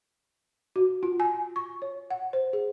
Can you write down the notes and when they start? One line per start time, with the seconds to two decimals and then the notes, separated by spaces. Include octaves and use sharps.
0.76 F#4
1.03 F4
1.20 G#5
1.56 C#6
1.82 C#5
2.10 F#5
2.33 C5
2.53 G#4